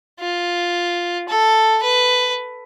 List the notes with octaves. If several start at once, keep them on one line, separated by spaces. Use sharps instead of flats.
F4
A4
B4